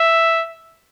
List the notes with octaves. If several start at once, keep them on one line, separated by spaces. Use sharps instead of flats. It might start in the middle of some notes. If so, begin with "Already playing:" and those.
Already playing: E5